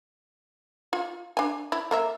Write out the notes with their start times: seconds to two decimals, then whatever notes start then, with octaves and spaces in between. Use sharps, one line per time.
0.93 F4
1.37 D4 G#5
1.72 E4
1.91 A#3 A#4 E5